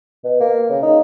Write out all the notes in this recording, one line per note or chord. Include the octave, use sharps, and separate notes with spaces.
B2
A#3
C#3
D#4